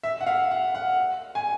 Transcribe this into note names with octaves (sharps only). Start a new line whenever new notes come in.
E5
F#5
F5
F#5
F#5
G#5